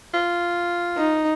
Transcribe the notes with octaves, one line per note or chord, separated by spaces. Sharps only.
F4
D#4